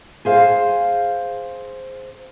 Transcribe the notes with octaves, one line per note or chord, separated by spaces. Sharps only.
G#4 C5 F5